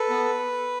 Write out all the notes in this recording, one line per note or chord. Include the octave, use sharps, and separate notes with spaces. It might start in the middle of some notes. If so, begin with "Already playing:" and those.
Already playing: A4 B4
B3